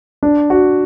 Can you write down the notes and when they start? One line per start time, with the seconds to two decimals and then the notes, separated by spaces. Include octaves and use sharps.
0.23 D4
0.50 F#4